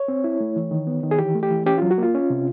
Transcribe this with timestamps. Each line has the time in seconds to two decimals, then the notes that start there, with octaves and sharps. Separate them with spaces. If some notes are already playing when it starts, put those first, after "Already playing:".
Already playing: C#5
0.08 C4
0.24 E4
0.40 A3
0.56 E3
0.71 D#3
0.87 B3
1.03 D#3
1.11 G#4
1.19 E3 G4
1.35 A3
1.43 G4
1.51 E3
1.66 C#4 G4
1.78 F#3 F4
1.91 F#4
1.98 A#3 F4
2.15 C#4
2.30 C3